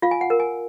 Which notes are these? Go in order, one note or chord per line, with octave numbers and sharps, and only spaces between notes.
F4 F5
G#5
F#5
A#4
G#5